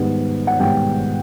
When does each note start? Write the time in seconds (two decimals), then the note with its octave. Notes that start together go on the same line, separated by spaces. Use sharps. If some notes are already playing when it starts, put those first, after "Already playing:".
Already playing: G#2 D#3 G3 B3
0.47 F#5
0.59 G#2 D#3 G3 B3 G5